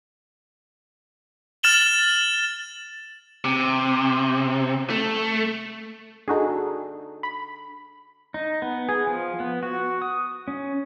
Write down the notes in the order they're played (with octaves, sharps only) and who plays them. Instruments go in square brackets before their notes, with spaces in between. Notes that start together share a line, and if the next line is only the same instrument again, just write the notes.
[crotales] F6 A6 E7 F#7 G7
[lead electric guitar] C3
A3
[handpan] D4 A4 [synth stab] D#4 F#4 G#4
[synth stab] B5
[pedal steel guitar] D#4
B3
G#4
F3
B3
F#4
D#6
C#4